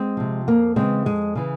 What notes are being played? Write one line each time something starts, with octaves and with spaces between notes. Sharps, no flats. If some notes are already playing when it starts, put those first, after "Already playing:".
Already playing: G#3 C4
C3 F3
F2 A#3
C#3 E3 G#3 C4
F2 G#3
C#3 E3